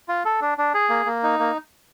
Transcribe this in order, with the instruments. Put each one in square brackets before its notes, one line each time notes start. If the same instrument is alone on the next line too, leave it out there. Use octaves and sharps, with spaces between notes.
[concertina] F4
A4
D4
D4
G#4
A#3
A#3
D#4
A#3